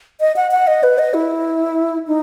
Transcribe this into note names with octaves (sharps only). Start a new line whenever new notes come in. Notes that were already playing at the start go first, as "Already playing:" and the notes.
D#5
F#5
F#5
D#5
B4
D#5
E4
D#4